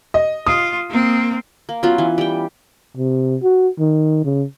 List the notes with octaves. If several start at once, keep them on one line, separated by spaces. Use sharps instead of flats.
D#5
F4 D#6
A#3 C4
A#3
F#3 B3 C#4 F4
E3
G3 G5
C3
F#4
D#3
C#3